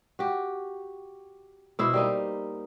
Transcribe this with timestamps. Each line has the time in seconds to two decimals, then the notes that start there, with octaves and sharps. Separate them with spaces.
0.19 F#4 G4
1.79 B2 E4 C5
1.93 G3 A#3 D#4